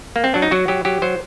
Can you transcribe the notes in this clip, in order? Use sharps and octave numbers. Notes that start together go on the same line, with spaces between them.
A#3
C4
F#3 D4
D#4
F#3 F#4
F#3 G4
F#3 G4
F#3 C5